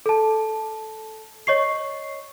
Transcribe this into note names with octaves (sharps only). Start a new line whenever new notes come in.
A4 A5
C#5 D#5 C#6 C7